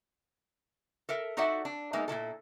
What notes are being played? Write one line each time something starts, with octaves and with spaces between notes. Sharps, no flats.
A4 A#4 E5
D#4 F#4 A4 D5 E5 F#5
D4
G#3 A#3 B3 D#4 E5
A#2 F3 E4 A4